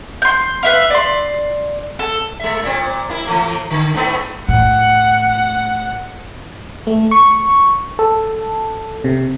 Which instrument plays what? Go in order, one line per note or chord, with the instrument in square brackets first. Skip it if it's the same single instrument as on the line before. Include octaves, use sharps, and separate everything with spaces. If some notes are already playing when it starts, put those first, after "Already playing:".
[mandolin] C6 G6
B4 E5 F5
D5 C6
A4
[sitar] G#3 E5
A#2 C4
A#3 E4
E3 A3 A#3
D3
G#2 A3 B3
[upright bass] A2 [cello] F#5
[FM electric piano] A3
C#6
A4
C3